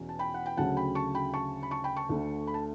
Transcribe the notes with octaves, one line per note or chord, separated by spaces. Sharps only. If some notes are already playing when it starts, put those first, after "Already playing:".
Already playing: E2 B2 C#4
A5
G5 B5
F#5
G5
D2 C#3 F#3 C#4 F#5 A5
G5 B5
A5 C#6
G5 B5
A5 C#6
B5
A5 C#6
G5 B5
A5 C#6
D2 D3 A3
B5
A5